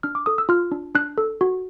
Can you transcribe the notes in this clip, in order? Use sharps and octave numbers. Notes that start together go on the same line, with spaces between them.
D4 F6
D6
A4 D#6
E6
F4 F6
D4
D4 F#6
A4
F#4